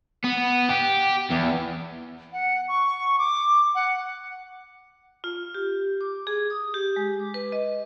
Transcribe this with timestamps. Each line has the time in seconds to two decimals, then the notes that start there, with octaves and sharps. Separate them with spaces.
0.24 B3
0.69 G4
1.30 E2
2.33 F#5
2.68 C#6
3.19 D6
3.75 F#5
5.24 F4
5.55 G4
6.01 D6
6.27 G#4
6.50 D#6
6.74 G4
6.96 G#3
7.20 D6
7.34 B4
7.52 D#5